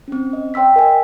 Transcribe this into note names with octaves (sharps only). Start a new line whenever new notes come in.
C4 C#4
D#5
C#5 G5 C6 E6 B6
A#4 D#5 G#5